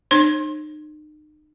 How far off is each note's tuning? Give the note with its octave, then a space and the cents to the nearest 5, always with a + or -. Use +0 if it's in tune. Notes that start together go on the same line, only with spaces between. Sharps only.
D#4 -40 C5 +45 C6 +25